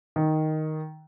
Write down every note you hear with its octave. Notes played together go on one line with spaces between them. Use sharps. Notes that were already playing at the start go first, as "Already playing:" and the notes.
D#3